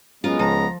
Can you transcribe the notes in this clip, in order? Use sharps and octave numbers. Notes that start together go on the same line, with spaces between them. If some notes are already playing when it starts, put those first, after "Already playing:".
F#2 G#3 B3 F4 A#4 F5
C#2 F3 A#5